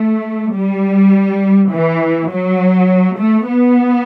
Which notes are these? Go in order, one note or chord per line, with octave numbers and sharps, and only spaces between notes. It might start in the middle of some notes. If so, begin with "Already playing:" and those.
Already playing: A3
G3
E3
F#3
A3
B3